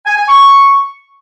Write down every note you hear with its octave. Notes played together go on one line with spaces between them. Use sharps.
G#5
G#5
C#6